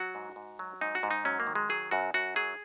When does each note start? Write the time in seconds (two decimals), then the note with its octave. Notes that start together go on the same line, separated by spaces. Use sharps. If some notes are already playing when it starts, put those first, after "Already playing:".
Already playing: F#3 F#4
0.15 G#2
0.36 G#2
0.59 F#3
0.81 G#2 D#4
0.95 F#4
1.03 G#2
1.11 D#4
1.25 F#3 C#4
1.40 A#3
1.47 D#3
1.55 G#3
1.69 F#3 G#4
1.91 F#2 F#4
2.14 F#2 F#4
2.36 F#3 G#4